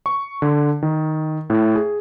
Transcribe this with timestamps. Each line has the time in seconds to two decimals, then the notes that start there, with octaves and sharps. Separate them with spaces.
0.06 C#6
0.42 D3
0.82 D#3
1.50 A2
1.75 G#4